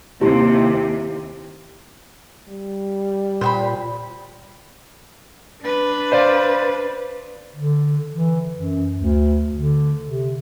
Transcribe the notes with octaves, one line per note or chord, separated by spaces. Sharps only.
D#2 C3 E4 G4
G3
A#2 C5 G5 B5
D4 B4
C5 D5 F5
D3
E3
F#2
D2
D3
C3